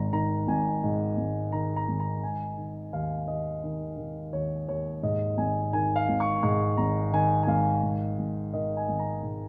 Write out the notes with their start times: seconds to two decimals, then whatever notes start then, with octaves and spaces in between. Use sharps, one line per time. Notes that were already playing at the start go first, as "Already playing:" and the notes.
Already playing: G#1 G#2 A#5
0.13 D#3 A#5
0.48 G#1 G#5
0.83 G#2
1.17 G#1
1.52 D#3 A#5
1.76 A#5
1.88 G#1
2.00 A#5
2.23 D#3 G#5
2.57 D#3
2.93 D#2 F5
3.27 D#2 D#5
3.63 D#3
3.97 D#3
4.33 D#2 C#5
4.68 D#2 C#5
5.03 G#2 D#5
5.38 G#1 G#5
5.73 D#3 G#5
5.96 F5
6.09 G#1
6.20 C#6
6.43 G#2 C#6
6.77 G#1 A#5
7.12 D#3 G#5
7.43 G#5
7.47 G#1 F5
7.83 G#2
8.19 G#1
8.53 D#3 D#5
8.77 G#5
8.88 G#1
8.99 A#5
9.23 G#2